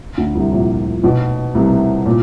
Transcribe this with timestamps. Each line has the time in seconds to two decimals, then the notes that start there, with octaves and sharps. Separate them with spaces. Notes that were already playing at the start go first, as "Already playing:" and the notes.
0.17 D2 D3
0.35 C2 C3
0.52 A#1 A#2
1.04 B1 B2
1.55 C2 C3
2.06 A#2